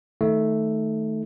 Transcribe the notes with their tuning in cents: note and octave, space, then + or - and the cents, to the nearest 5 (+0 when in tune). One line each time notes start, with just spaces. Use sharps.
D#3 +15 A3 +0 D#4 +30